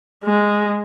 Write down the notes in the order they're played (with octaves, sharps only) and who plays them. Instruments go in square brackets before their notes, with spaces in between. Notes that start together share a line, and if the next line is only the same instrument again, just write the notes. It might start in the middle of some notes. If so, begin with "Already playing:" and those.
[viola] G#3